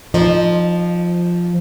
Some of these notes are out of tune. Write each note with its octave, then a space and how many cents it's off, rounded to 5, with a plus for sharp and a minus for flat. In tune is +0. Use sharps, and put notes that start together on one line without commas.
F3 +0 D#4 +0 D#5 -35